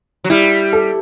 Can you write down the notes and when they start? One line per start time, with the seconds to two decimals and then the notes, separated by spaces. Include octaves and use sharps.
0.24 F#3
0.30 G3 E4
0.73 A4